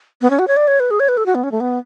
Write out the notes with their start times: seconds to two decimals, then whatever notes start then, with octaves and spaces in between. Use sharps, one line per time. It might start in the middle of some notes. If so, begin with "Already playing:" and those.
0.22 B3
0.30 C#4
0.39 F#4
0.48 C#5
0.57 D5
0.68 C#5
0.80 B4
0.91 G#4
1.00 C#5
1.09 B4
1.17 A4
1.26 F#4
1.35 B3
1.43 C#4
1.52 A3
1.60 B3